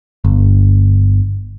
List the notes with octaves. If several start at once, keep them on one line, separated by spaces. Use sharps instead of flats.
G1